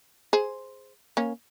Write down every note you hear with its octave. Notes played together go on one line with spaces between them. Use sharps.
G#4 C5
A#3 C#4